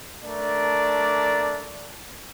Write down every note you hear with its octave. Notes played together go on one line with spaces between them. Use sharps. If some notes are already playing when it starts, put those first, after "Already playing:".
A3 D4 A#4 D5